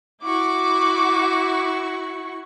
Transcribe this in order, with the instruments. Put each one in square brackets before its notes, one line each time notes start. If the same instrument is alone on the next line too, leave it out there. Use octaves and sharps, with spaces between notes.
[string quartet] E4 F#4 C#6 [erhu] D6